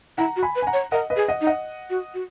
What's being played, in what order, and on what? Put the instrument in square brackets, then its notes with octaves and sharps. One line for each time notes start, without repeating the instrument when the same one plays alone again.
[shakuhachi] E4 [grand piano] F#5 A#5
[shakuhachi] F#4
[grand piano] G#5 B5
[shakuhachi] B4
[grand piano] G#5
F#5 A#5
[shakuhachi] C#5
[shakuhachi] A#4 [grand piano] D#5 F#5
[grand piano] B4 D#5
[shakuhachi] G#4
[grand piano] D#5 F#5
[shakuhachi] D#4
[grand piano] D#5 F#5
[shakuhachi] F#4
F#4